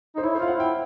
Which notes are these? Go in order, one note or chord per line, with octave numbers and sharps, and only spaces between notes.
D#4 C5
E4 C#5
C5
F4 F5
F#5
E4 G5